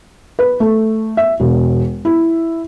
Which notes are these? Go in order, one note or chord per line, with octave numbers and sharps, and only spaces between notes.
B4
A3
E5
E1
E4